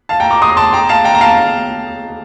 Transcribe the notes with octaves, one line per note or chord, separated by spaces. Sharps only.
F5 A5
G5 A#5
A#5 D6
C6 D#6
A5 C6
G5 A#5
F5 A5
G5 A#5
A#5
F5 A5